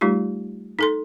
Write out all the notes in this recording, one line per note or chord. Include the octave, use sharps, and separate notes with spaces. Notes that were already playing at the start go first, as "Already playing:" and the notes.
G3 A3 D#4 F4 G4
D#4 A4 C6